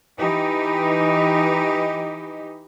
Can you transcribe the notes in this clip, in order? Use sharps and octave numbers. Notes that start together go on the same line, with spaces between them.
E3 D#4 G4